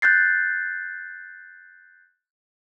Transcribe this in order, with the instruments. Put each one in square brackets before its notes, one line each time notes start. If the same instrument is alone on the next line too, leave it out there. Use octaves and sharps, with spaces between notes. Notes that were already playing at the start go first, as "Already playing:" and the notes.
[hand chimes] F#6 G6 A6 C7